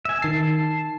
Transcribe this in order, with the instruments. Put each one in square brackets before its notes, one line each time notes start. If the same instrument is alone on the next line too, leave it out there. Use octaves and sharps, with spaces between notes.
[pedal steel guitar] E5 G#5
[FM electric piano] D#3 C7 [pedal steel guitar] A5